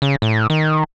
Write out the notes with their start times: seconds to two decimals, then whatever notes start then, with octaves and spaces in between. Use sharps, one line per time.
0.02 C#3
0.22 A2
0.50 D#3